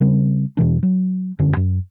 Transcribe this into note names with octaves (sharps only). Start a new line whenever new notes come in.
C#3 G3 C4
E2 B2 E3 D4
F#3
E1 F#2 D3 C#4
F#2